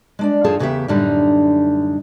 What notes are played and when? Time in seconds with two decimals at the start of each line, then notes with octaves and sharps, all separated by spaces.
0.19 G#3 D4 D5
0.44 F#2 D#3 F4 G#4 A4 A5
0.60 E2 C#3 A3 B3 G4 E5
0.88 F#2 A2 D3 G3 D4 D#4